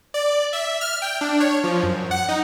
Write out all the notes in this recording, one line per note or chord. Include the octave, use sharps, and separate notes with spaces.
D5
E5
F6
G5
D4
C#5
F3
F#2
F#5
D#4